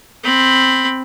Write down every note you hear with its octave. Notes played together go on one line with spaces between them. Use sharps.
C4 B5